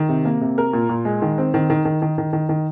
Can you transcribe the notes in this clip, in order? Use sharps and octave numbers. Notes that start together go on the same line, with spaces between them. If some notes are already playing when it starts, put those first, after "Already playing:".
Already playing: D#3
C3
A#3
C3
A#4
A#2
A#2
G#3
D#3
C4
D#3
D#3
D#3
D#3
D#3
D#3
D#3